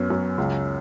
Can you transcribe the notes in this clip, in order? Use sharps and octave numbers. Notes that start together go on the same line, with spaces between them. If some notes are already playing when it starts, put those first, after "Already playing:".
Already playing: F#2 B3 C#4
F#2
C#2